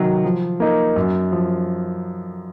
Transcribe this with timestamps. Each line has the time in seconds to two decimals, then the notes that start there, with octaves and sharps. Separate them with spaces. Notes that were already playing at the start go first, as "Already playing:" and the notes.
Already playing: C3 D#3 F#3
0.25 F3
0.60 A#3 D#4
0.96 F#2
1.32 F3